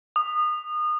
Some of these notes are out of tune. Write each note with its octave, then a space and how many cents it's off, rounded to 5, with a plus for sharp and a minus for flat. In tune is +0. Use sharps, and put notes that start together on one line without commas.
D#6 -30